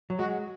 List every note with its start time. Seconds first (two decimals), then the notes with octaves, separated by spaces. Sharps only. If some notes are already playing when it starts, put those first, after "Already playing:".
0.10 F#3
0.18 G#3 F#4